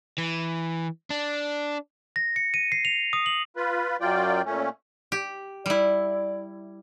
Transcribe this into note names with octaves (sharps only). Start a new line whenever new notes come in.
E3
D4
A#6
C#7
D#7
C7
F7
D#6
F#7
F4 B4
F#2 F#3 F4 D5 G5
A#2 A3 C#4
G4
G3 E4 D5